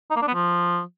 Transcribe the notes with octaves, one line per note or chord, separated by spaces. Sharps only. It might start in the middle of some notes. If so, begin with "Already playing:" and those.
D#4
A#3
D4
B3
F3